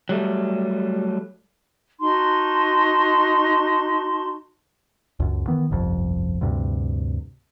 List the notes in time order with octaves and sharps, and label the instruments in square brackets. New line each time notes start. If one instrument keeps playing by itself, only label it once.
[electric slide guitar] F#3 G3 A3
[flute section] D#4 F#4 A5 C6
[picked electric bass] C#2 F#2
D#3 E3 B3
G1 C2 F2
D2 G2 C3